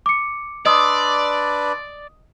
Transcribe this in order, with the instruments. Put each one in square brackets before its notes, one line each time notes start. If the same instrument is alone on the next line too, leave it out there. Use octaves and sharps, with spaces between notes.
[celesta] D6 C#7
[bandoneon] D4 B4 [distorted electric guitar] D5 [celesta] D#5 D#6 [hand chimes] C6 E6 A6